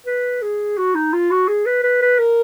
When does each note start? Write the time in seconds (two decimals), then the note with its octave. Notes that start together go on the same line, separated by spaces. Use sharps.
0.06 B4
0.42 G#4
0.78 F#4
0.95 D#4
1.13 F4
1.31 F#4
1.48 G#4
1.66 B4
1.83 B4
2.02 B4
2.19 A#4